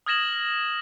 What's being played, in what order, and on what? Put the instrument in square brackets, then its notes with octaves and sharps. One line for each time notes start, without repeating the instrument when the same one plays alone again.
[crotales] D#6 F6 G#6 A#6 E7 F#7